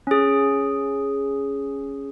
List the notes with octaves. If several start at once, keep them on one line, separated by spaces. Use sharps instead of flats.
C#4 G#4